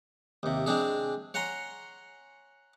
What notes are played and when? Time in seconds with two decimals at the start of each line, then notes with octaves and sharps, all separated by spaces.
0.43 D#2 C3
0.66 G#3 C4 D4 G#4
1.34 C#5 F#5 G#5 A#5 C6